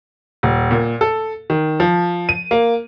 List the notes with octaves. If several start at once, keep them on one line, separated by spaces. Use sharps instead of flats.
D#1
A#2
A4
D#3
F3
D#7
A#3